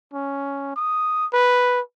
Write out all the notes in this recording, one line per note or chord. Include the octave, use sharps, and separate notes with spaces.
C#4
D#6
B4